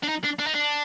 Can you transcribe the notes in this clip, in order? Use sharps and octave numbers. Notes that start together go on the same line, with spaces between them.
D4
D#4
D4
D4
D#4
D4